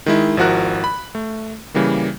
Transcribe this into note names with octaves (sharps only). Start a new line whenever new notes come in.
D#3 G#3 E4
G#1 F3 E4 F#4 A#4 F#6
B5
A3
C#3 E3 G3 A#3